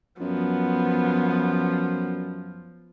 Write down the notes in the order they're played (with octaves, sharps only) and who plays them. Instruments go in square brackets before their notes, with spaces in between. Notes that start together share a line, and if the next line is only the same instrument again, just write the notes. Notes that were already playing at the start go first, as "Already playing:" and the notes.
[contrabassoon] F#2 [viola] F3 [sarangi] B3